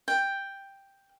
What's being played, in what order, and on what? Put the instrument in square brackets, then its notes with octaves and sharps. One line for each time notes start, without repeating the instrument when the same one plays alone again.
[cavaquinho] G5